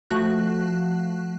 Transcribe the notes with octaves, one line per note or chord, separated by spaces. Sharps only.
F3 A3 F#4 F#6